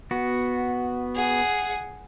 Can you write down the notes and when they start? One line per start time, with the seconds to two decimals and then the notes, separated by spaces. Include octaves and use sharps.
0.11 B3 F#4
1.16 G#4 F#5